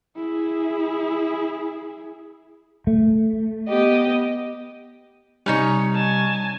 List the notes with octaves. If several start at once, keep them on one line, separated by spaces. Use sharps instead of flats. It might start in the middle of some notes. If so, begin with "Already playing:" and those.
E4 G#4
A3
B3 G4 D#5
C3 G3 C#4 D#4 C#5
G#5 A5